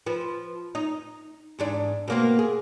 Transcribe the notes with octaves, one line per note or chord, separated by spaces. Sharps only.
F3 B4
D#4
E2 G#2 D4
B2 A#3 C4
G#4